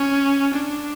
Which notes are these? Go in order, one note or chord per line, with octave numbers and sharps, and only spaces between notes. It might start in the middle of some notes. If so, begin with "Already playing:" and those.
Already playing: C#4
D4